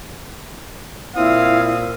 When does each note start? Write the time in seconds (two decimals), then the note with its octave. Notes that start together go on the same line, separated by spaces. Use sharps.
1.16 A#2 C4 E4 F5 D#6